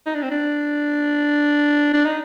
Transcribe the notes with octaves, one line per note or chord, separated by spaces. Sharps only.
D#4
D4
C4
D4
D4
D#4